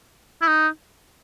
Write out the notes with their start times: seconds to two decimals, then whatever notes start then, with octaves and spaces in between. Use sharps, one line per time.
0.41 E4
0.47 D#4